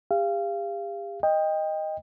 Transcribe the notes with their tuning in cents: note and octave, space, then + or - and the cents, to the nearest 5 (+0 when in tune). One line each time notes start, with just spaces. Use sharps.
G4 +40 F5 -25
D#5 +0 G5 +20